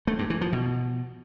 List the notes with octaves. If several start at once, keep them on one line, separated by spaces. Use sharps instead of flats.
A3
G2
E3
F3
B2